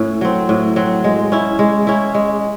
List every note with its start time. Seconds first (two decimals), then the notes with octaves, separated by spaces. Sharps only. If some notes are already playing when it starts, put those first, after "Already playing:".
Already playing: A2 C#4 E4
0.21 F#3 C4
0.49 A2
0.76 F#3 C4
1.04 G#3
1.32 C#4 E4
1.59 G#3
1.87 C#4 E4
2.14 G#3